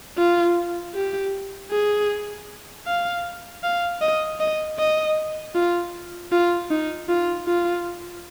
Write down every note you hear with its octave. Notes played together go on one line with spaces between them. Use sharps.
F4
G4
G#4
F5
F5
D#5
D#5
D#5
F4
F4
D#4
F4
F4